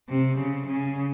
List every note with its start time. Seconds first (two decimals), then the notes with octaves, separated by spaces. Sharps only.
0.09 C3
0.39 C#3
0.67 C#3